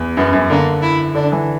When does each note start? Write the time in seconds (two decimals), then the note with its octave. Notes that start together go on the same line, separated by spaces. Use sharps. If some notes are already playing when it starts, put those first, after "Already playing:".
Already playing: E2
0.17 F#2 B3
0.33 F#2
0.50 D3 A#3
0.82 E4
1.15 D3 D4
1.32 E3